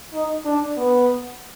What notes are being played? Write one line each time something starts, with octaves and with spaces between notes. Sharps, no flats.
D#4
D4
B3